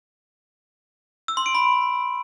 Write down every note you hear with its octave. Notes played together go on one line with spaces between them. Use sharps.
E6
C6
D7
B5